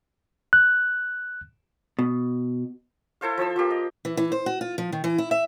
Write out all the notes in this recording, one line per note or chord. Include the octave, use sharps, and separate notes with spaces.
F#6
B2
E4 A4 C5 F5
F3 C5 A5 E6
F3 A#3 G4
D#5
E3
E3
C5
F#4
F4
F3
D#3
E3
E4
E5